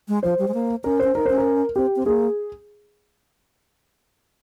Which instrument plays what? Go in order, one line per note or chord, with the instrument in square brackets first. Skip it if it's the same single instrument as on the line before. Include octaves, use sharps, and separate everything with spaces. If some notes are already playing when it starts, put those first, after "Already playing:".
[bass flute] G#3
[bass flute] F3 [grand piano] C5
[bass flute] G3
G#3
A#3
[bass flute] C#4 [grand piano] A#4
[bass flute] C#4 [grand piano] C5
[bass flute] D#4 [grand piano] A#4
[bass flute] C#4 [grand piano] C5
[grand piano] A#4
[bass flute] C4 [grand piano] G4
[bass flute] C4
[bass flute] A#3 [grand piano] G#4